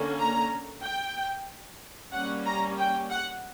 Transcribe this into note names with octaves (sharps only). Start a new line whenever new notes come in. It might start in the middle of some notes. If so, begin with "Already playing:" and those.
Already playing: D3 A#3 C#4
A#5
G5
G3 A#3 C#4 F#5
A#5
G5
F#5